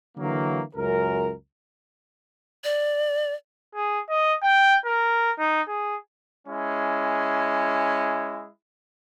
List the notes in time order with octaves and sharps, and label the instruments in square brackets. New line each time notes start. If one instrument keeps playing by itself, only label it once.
[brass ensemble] D3 E3 F#3 A#3
C#2 F#2 A#4
[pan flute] D5
[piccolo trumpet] G#4
D#5
G5
A#4
D#4
G#4
[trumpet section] G#3 C#4 E4